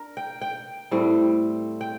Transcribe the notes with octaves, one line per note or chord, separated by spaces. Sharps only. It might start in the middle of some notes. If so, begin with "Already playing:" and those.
Already playing: D4 A#4
G5
G5
A2 G3 C4
G5